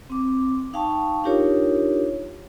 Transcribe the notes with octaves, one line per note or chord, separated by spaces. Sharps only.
C4 D6
D#4 F5 G5 A5 C#6
D4 D#4 F4 G4 A#4 C#5